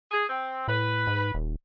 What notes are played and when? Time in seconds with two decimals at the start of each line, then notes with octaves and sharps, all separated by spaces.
0.11 G#4
0.29 C4
0.68 A2 B4
1.07 G#2
1.34 D#1